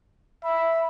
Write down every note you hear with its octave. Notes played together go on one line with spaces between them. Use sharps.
E5 B5